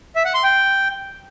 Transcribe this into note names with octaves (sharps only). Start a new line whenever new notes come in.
E5
F#5
C6
G5